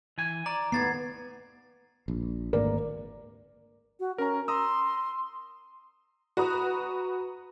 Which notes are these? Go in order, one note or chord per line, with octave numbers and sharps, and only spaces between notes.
E3 G#5
D5 A#5
D#2 A2 B3 G#6 A6 C7
A#1
G#1 D2 A#3 A#4 D5
F#4
C#4 A#4 A#5
A#5 C6 D#6 E6
F#4 B4 A#5 D#6